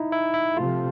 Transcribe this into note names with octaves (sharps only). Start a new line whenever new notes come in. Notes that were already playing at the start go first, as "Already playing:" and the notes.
Already playing: D#4 E4
E4
E4
C3 F3 A3 F4